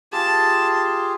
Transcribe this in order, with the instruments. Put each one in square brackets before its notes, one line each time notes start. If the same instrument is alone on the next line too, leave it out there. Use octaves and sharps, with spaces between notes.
[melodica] F4 G4 G#4 [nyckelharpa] A5